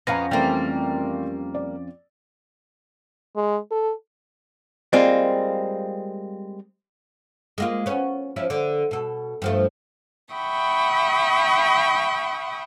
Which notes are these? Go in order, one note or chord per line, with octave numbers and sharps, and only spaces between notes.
F2 B3 C#4 F5 A#5 A#6
E3 G3 A3 A#3 C4
D5
G#3
A4
G3 G#3 A#3 C4 F4
G#3 A#3 F4
B3 C#4
F3 C#4 E4
D3
B2 A4
G2 F3 A3
E5 F#5 G5 B5 C#6 D#6